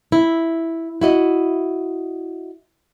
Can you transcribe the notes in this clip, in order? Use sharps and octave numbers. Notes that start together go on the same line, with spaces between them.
E4
E4 F#4 D#5